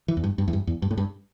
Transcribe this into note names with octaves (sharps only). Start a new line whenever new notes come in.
E3
E2
G2
G2
E2
G2
E2
G2
A2
G2